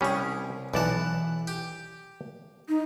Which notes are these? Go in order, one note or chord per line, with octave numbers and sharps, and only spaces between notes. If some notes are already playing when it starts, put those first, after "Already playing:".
C2 G3 C#4 G#4
B1 E3 D5 F#5 A5
G4
D#4